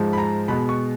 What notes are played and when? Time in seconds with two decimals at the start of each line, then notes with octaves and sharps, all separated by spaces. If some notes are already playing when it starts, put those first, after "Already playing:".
Already playing: G#2 F3 G#3
0.13 B5
0.18 A#5
0.48 B2 G#3 B3 B5
0.69 C#6